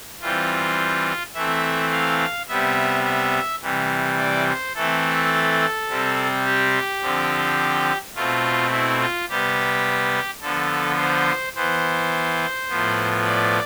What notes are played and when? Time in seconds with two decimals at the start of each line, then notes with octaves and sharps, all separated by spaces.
0.21 E3 G3 C4 F4
1.34 E3 A3 C4 E5
1.91 F5
2.49 C3 G3 B3 E5
3.05 E5
3.62 C3 E3 G3
4.18 D5
4.47 C5
4.75 E3 A3 C4 A4
5.89 C3 G3 C4
6.45 G4
7.02 D3 F3 C4
8.15 B2 A3 C4 F4
8.72 E4
9.00 F4
9.29 C3 G3 B3 G4
10.41 D3 F3 B3 A4
10.98 C5
11.55 E3 B3 C5
12.69 A2 F3 B3
13.26 D5